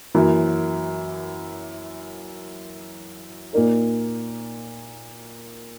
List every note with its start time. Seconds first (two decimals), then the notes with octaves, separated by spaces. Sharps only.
0.15 F#2 E3 A#3
3.53 A#2 A#3 D#4 A#4